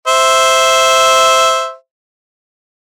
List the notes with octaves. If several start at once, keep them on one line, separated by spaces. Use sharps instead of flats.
C5 E5